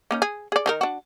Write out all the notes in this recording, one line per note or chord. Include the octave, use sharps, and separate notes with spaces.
A#3 C#4 D#4
G#4
G#4 D5
D#3 D#4 A#4
D4 F#4